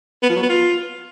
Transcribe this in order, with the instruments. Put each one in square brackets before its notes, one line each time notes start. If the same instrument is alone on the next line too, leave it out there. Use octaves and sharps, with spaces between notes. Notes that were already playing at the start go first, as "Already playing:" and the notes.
[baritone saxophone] B3
F3
F#3
B3
F4